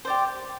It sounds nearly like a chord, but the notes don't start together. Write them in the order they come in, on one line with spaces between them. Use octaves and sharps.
C5 D5 G4